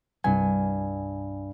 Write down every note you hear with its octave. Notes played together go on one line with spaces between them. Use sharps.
C2 G2 G#5